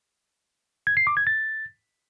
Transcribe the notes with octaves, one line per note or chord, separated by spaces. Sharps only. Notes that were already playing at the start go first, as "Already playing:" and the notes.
G#6
C7
D6
G#6
A6